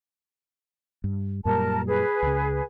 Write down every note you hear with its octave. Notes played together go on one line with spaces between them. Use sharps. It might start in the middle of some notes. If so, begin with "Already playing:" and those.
G2
F#2 A#2 G3 A#4 A5
G#4 B4
C#2 C#3